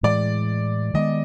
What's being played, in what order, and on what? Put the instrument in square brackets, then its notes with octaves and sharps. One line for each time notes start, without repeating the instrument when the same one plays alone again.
[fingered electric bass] A2 E3 G#3 [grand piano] D5
[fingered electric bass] D#3 G#3 B3 [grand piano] D#5